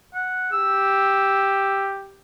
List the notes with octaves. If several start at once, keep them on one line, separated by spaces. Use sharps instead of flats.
F#5
G4 E6